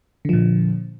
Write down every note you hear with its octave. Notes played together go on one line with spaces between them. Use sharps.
A#2 D3 F3